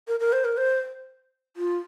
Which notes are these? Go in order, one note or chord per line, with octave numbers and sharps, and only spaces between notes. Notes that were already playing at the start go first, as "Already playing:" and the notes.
A#4
A#4
C5
A#4
C5
F4